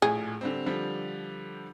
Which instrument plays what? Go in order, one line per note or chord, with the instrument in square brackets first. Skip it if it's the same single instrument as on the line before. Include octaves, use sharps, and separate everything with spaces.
[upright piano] A#1 A2 [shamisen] G#4
[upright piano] D3 G3 C4
D3 F3 G3